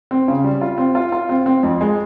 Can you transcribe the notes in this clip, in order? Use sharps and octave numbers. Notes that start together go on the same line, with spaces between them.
C4
C#3
G3
F4
C4
F4
F4
C4
C4
F2
G#3